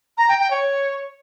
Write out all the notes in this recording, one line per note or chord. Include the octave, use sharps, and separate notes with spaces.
A#5
G5
G5
C#5